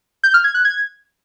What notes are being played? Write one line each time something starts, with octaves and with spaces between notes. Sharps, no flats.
G6
F6
G#6
F#6
G#6